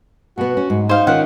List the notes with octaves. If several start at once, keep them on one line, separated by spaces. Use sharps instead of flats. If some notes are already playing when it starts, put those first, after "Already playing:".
B2 B3 F#4
C#4
G#2
D#4 C5 F5
D#3 C#4 F4 F#5